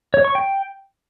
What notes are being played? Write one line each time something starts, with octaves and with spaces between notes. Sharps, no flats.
C#5
C#6
G5